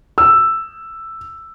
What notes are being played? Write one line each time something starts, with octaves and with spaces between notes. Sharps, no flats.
E6